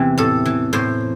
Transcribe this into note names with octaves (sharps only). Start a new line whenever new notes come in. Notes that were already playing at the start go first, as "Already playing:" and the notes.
Already playing: E2 C3 E3 G4
A2 A4
E3
A2 C5